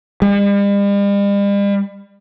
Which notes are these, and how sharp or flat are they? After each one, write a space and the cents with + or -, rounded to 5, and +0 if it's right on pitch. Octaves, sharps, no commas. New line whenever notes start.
G3 +45